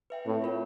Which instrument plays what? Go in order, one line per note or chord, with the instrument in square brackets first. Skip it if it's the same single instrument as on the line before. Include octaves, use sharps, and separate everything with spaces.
[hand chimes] B4 E5 G5
[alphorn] A2 [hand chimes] C4
[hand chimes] F4 A#4 C#5